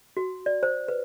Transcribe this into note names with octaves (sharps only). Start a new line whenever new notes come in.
F#4
D5
C5
B4